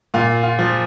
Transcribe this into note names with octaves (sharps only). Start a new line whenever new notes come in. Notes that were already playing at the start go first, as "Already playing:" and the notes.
A#2 F4
F4
F3